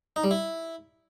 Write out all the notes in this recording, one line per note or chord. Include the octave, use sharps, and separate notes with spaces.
D#4
G3
E4